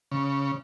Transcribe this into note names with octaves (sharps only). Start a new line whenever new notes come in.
C#3